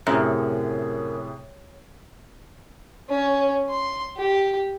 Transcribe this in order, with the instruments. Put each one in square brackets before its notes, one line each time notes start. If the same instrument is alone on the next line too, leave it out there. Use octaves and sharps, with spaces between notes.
[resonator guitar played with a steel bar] F#2 [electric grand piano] A2 C3 G#4
[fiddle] C#4
C6
G4